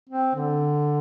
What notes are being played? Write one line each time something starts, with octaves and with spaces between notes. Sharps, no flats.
C4
D3